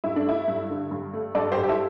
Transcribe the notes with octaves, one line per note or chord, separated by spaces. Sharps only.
G2 E4
D4
A3 E4
G2
D3
G2
A3
G2 A4 D5
G4 C5
G2
G4
E4 A4